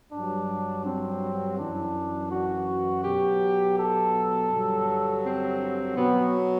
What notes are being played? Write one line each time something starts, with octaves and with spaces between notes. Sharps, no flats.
G2 F#3 D4
C4
F#2 E3 D4
F#4
B2 F#3 G4
A4
G2 D3 F#3
C4
B2 F#3 B3